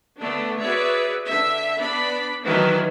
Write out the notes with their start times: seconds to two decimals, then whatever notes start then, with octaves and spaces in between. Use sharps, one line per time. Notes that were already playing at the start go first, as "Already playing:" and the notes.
0.19 D3 A3 B3 D4
0.59 F#4 G#4 B4 C#5 D5 E5
1.27 D3 E5
1.80 B3 D4 D5 B5
2.46 D#3 E3 F#3 D4 F#4 B4